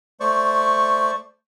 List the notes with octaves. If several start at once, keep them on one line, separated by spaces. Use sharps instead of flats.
A3 C5 D5 C#6